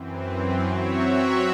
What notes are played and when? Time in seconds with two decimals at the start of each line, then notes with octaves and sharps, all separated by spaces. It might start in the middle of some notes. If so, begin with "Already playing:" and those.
Already playing: F#2 E3 C4
0.66 F#3 C4 F#4 C#5 E5